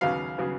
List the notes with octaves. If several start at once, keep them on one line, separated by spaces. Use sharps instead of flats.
D#2 C#3 F#3 B3 F5
C#3 F#3 B3